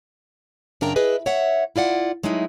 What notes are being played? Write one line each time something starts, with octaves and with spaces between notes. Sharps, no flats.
F#2 C#3 D4 A#4 G5 A#5
E4 G#4 B4 D#5
C#5 E5 F#5
E4 F4 D5 F#5
F#3 G#3 A3 D#4 E4